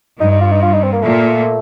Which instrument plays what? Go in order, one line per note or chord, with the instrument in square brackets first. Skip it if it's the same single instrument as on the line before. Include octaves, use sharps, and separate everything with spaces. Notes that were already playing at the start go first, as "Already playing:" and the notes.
[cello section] G2 [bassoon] D#4
[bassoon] D#4
F4
D#4
F4
D#4
C4
A#3
[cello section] A#2 [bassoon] A3